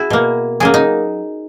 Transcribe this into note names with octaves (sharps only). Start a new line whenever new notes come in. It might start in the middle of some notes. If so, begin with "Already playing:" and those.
Already playing: E4 F#4 G#4
B2 A#3
C#3 F#3 A#3 G#4
D#4